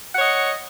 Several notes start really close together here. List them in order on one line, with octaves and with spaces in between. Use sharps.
F#5 C#5 D#5